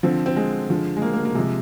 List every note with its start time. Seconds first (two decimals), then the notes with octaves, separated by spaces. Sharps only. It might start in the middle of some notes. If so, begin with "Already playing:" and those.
0.03 D3 F3 C4
0.26 C4
0.36 G#3
0.70 D3 F3
0.97 G#3
1.02 A#3
1.13 A#3
1.25 A#3
1.35 C3 F3 G#3